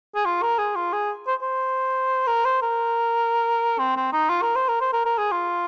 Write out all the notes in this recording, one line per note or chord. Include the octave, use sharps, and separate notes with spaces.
G#4
F4
A#4
G#4
F4
G#4
C5
C5
A#4
C5
A#4
C4
C4
D#4
F4
A#4
C5
A#4
C5
A#4
A#4
G#4
F4